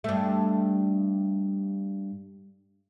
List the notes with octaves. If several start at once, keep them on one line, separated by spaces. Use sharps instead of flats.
G2 A3